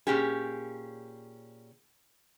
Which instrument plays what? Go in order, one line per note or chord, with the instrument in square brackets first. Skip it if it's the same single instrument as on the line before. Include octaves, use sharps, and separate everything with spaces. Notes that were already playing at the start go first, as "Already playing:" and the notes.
[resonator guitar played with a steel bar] A#2 C#4 G4 G#4